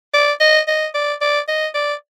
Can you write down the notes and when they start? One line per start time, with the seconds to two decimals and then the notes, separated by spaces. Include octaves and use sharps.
0.14 D5
0.40 D#5
0.67 D#5
0.94 D5
1.21 D5
1.48 D#5
1.75 D5